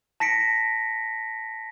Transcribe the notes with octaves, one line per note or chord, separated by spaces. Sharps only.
A5 A#6 B6 C#7 D7